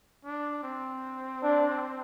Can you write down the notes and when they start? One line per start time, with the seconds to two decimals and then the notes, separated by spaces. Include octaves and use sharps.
0.25 D4
0.63 C4
1.43 D4